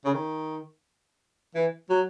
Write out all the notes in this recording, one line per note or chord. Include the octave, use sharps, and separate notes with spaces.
C#3
D#3
E3
F#3